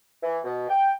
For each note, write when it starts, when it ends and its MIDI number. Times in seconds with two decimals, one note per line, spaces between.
0.23 0.38 52
0.44 0.66 47
0.69 0.92 79